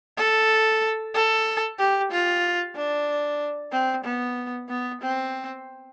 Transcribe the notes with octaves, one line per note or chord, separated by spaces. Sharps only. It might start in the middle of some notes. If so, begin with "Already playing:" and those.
A4
A4
G4
F4
D4
C4
B3
B3
C4